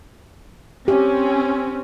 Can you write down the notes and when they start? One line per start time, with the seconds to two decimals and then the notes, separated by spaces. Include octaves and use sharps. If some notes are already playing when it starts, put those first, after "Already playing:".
0.88 C4 C#4 G4